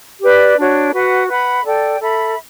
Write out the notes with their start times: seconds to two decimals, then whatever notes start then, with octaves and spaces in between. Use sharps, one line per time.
0.21 G4 B4 D5
0.56 D4 F#4 C#5
0.93 F#4 B4 F#5
1.28 B4 F#5 B5
1.64 A4 D5 G5
2.00 A4 E5 B5